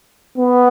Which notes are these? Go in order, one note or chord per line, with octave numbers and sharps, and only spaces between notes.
B3